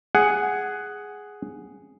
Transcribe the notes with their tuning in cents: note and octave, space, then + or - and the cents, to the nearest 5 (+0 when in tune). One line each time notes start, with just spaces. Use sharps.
G#4 +0 F#5 +10